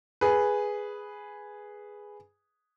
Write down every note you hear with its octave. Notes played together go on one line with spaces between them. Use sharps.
G#4 B4